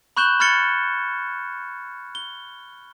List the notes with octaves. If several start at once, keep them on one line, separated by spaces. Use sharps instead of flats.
B5 C#6 F#6 G6 E7 G7
B5 F6 G#6 A6 C#7 G7
G7